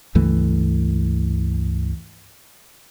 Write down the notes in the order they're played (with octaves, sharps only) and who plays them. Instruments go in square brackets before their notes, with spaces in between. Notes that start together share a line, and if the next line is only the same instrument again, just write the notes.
[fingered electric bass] C#2 G2 E3 A3